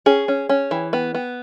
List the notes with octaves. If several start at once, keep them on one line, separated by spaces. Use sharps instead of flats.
C#4 G#4
C#4
C#4
E3
B3
B3